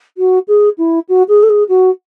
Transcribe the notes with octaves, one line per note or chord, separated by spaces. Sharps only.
F#4
G#4
E4
F#4
G#4
A4
G#4
F#4